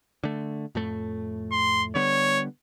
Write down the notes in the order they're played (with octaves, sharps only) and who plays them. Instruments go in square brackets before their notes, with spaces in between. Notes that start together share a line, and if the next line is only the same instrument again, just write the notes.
[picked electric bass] D3 A3
F2 A2 A3
[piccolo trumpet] C6
[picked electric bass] D3 G3 B3 [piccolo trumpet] C#5